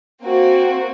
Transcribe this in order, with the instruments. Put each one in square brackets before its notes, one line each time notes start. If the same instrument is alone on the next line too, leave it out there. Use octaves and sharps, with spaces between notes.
[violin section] A#3 C4 F#4